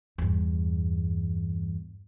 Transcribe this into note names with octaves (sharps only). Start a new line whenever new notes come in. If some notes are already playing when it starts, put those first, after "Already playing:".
E2 G2